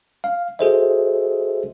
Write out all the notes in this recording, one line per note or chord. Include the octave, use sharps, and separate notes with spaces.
F5
F#4 G#4 A4 C5 D#5 E5